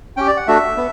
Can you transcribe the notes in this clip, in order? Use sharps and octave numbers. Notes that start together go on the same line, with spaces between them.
C#4 G4 G5
D5
F#5
A3 D4 F#4 E5
B3